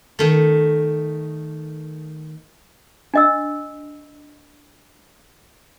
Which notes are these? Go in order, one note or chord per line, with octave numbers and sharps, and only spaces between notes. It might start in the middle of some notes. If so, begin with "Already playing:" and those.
D#3 A3
D4 D#5 E6